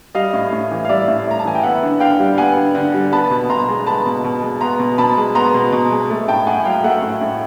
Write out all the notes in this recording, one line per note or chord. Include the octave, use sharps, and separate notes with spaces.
G3 D#5 F5
A2
A2
E3
F5
G3 D5 E5
A2
A2 A#5
A5
E3 G#5
G5
B3 E5 F#5
D3
D3 F5 G5
G3
B3 F#5 G#5
D3
D3
G3
B3 A5 B5
B2
B2 A#5 C6
G#3
B3 A5 B5
B2
B2
G#3
B3 A#5 C6
B2
B2 A5 B5
G#3
B3 A#5 C6
B2
B2
G#3
A3
A2 G5 A5
A2 F#5 G#5
F#3 F5 G5
A3 E5 F#5
A2
A2